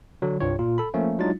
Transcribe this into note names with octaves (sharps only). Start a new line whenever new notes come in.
D3 F#3
C2 G2 F4 C#5
A#2 F4
A4 B5
F3 A3 A#3 C#4
F#3 G#3 D4 D#4 F4 A6